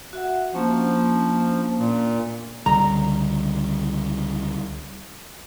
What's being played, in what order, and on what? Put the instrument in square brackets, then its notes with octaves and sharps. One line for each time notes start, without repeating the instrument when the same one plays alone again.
[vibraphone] F#4 E5 F#5
[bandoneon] F3 [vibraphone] A#3 C#4 D4
[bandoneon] A#2
[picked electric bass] C#2 D3 G3 [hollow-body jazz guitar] A#5